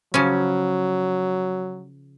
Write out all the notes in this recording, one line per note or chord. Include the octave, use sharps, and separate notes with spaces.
C#3 F3 F#3 C#4